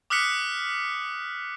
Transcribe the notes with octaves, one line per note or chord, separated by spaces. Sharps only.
D6 D#6 F6 F#6 B6 C#7